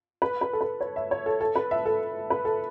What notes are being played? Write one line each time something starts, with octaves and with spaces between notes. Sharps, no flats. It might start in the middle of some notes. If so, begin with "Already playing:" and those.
B4
B4
A4
B4
C#5
E5
C#5
A4
A4
B4
E5
A4
B4
A4